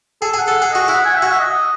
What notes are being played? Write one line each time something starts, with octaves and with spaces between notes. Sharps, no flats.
G#4 A4
G#4
F#5
A4
F#5
G#4
F#4 D#5
E4 F#5
G#5
E5
F#4 F#5
E5
D#5